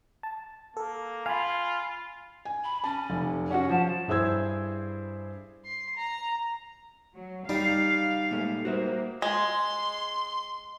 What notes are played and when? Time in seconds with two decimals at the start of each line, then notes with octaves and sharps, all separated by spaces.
0.23 A5
0.77 A#3 A4
1.26 F4 F5 G#5 B5
2.45 G#5
2.64 B5
2.84 C#4 A5
3.10 F1
3.51 C#4 F#4 F#5
3.69 F3 A5
4.08 G2 E4 G#4 C5 E6 G#6
5.65 C6
5.96 A#5
7.16 F#3
7.49 G3 D#4 F5
8.31 A#2 G#3 A3
8.65 G3 A#3 F#4 C5 E5
9.22 G#3 C6